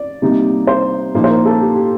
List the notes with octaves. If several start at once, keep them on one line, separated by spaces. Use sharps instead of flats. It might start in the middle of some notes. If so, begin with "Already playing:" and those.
Already playing: D5
C3 G3 A#3 D#4
C5
A#2 F3 A#3 D#4
C5
A#4
A4
G4
G4